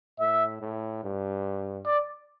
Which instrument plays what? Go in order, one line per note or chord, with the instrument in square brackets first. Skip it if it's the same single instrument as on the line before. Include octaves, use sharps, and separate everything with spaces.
[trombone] A2 [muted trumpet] E5
[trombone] A2
G2
[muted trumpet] D5